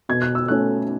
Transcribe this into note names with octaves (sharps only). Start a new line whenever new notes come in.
B2 G#6
F#6
E6
A3 C#4 F#6